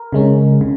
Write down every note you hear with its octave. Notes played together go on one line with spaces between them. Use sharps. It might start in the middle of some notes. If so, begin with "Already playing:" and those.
Already playing: A#4
C#3 G#3 C#4
C#3